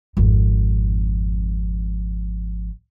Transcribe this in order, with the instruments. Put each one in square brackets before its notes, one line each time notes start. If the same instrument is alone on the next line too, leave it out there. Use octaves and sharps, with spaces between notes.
[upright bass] G#1 F2